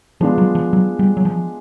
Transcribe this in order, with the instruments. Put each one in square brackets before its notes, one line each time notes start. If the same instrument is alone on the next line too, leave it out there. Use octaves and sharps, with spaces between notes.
[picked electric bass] F3 [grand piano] G#3 B3 D4 F4 G#4
[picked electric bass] F#3
F3
F#3
G3
F#3
F3